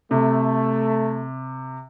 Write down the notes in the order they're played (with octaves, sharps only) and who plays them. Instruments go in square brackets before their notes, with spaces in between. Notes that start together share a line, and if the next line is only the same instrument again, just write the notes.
[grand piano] C3 [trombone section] A3